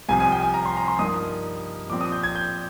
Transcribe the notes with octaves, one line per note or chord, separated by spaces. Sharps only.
C2 C3 F3 G#5
G#5
G5
G#5
A#5
C6
A#5
C6
G2 F3 A#3 D#4 D#6
A#2 F3 C4 D6
D#6
G6
G#6
G6